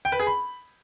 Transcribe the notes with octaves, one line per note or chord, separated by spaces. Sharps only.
G5
B4
G#4
B5